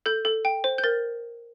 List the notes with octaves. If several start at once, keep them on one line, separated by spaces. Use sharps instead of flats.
A4 G6
A4
G5
C5
G6
A#4 A6